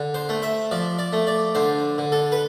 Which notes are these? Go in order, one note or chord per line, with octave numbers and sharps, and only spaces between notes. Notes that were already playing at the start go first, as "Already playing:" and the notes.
Already playing: D3
C5
A3
E5
F3 D5
D5
A3
D5
D3 C5
D3
A4
B4